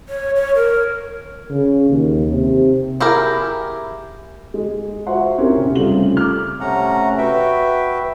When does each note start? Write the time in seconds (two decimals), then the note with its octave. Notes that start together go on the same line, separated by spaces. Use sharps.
0.09 C#5
0.36 C#5
0.55 A#4
1.50 C#3
1.90 D#2
2.31 C3
3.00 E4 G4 G#4 A#4
4.54 G#3
5.07 F4 F#4 C5 E5 F#5 C6
5.38 C4 C#4 E4 G4 A#4
5.57 C3
5.76 C#3 G3 A3 C4 F4 F#7
6.17 D6 F6
6.61 C3 A3 C#4 F#5 A#5
7.18 F#4 B4 E5 G5